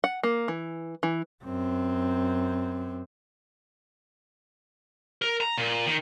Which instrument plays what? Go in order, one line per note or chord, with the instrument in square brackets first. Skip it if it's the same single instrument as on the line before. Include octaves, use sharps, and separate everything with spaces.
[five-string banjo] F#5
A#3
E3
E3
[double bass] F#2 C4
[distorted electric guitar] A#4
A#5
A#2
D#3